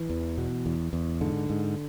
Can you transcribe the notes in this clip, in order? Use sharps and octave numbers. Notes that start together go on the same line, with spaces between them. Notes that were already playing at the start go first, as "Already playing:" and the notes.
Already playing: E3
E2
B2
E2
E2
G#2 D3
G#2